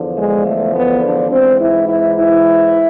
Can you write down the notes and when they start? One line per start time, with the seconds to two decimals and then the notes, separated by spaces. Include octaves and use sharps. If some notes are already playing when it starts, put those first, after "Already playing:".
Already playing: E2 D3 F3
0.15 G#3
0.44 A3
0.73 B3
1.01 D4
1.29 G#2 E3 C4
1.59 E4
1.87 E4
2.16 E4